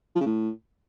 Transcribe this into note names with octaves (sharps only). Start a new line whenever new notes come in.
F3
C#3
A2